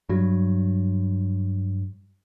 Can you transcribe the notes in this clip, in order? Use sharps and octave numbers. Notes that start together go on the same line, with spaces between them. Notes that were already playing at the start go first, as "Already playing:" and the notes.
G2 F#3